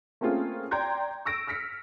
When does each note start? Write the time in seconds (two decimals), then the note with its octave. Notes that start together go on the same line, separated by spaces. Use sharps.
0.21 A3 A#3 C4 C#4 F4 G#4
0.71 D5 G5 A#5 C6 G6 G#6
1.25 C#6 E6 A#6 D7
1.47 E6 F6 A#6 B6 C#7